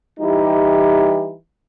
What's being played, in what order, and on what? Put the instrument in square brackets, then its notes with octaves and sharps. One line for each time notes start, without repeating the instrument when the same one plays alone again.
[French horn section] E3 G3 D#4 E4 G4